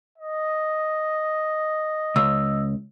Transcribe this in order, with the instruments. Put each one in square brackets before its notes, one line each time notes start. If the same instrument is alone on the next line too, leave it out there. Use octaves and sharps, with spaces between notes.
[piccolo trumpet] D#5
[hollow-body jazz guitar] C#2 [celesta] E6